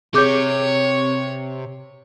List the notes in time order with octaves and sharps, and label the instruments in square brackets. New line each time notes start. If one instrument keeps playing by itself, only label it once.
[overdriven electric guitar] C3 [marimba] G#4 D6 G6 [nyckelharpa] C#5 C#6